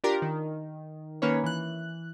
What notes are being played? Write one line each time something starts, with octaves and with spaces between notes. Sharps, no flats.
D4 F4 G4 A#4
D#3
D#3 A#3 C#4 B4 C#5
E3 F#6